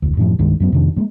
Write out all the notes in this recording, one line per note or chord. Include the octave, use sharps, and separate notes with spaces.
E1 D2
F#2 A2 F3
C2 G2 D#3 G#3
F#2 F#3 B3
F2 C3 D#3 D4
G2 G#3 A#3